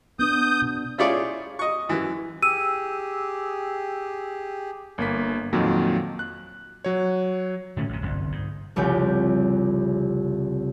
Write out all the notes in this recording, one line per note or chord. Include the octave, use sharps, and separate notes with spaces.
B3 D4 B4 D#6 G6
B2
C#4 E4 F4 G#4 C#5 D5
D#5 C#6
F#2 E3
G4 G#4 E6 D#7
G1 A#3 B6
F2 A#2 D#3 F#3
F#6
F#3 C#5
A2 D3 A3 C#4
A1 F#2 A2 C3
G1 C2 F#2
G#2
F1 C2 C#3 C4 G6 B6